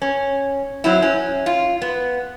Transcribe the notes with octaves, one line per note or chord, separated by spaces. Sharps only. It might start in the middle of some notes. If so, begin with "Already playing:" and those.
C#4
F#3 C4 E4
C#4
F4
B3